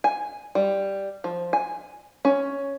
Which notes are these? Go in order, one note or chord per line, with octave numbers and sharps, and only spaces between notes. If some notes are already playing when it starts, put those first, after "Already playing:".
G#5
G3
F3
G#5
C#4